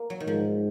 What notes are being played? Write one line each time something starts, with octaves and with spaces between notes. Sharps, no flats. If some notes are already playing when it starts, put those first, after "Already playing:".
Already playing: A#3
F#3
D#3
G#2 F3